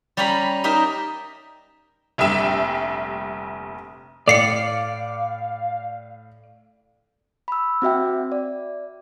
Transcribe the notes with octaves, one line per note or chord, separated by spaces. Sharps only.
G3 C#4 G4 A#5 B5
D#4 G4 A#4 E5
F1 A#1 G3 E5 E7
A2 A4 D5 F5 C7 C#7
B5 E6
C4 F#4 E5 G5
D5